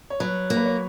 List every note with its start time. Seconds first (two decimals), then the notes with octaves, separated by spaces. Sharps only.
0.10 C#5
0.20 F#3 B4
0.50 A#3
0.57 B4
0.66 C#5